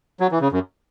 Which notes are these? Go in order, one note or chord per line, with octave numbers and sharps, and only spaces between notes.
F#3
E3
C#3
F#2